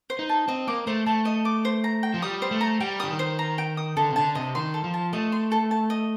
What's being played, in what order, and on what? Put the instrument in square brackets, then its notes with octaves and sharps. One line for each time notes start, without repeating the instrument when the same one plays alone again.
[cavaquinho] C5
[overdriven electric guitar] D#4
[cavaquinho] A5
[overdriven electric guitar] C4 [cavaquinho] D#5
[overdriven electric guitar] A#3 [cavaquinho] D6
[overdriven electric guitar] A3 [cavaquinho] C5
[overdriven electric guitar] A3 [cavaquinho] A5
[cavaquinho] D#5
D6
C5
A#5
G5
[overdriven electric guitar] F3
[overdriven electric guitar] G3 [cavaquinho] D#6
[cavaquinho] C5
[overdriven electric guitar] A3
[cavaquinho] A#5
[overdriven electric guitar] G3 [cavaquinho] G5
[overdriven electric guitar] D3 [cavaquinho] D#6
[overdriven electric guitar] D#3
[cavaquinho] C5
A#5
G5
D#6
[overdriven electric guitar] D3 [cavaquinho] A4
[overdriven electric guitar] C3
[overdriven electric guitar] D3 [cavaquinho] A5
[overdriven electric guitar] C3 [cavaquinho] D#5
[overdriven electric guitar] D#3 [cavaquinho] C6
[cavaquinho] A4
[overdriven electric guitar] F3
[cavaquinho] A5
[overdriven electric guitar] A3 [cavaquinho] D#5
[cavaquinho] C6
A4
A5
D#5